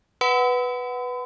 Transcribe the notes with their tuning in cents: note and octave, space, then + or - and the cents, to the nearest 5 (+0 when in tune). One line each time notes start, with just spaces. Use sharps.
B4 +0 F#5 +10 B5 +45